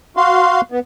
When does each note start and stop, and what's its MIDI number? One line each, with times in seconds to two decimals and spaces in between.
0.17 0.61 66
0.17 0.61 77
0.17 0.61 84
0.72 0.79 59